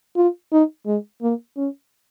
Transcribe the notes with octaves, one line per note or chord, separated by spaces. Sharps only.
F4
D#4
G#3
A#3
C#4